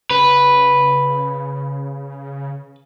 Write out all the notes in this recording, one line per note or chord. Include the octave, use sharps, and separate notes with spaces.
C#3 B4